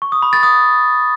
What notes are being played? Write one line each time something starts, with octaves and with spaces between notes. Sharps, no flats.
C#6
D#6
B5
A6
D#6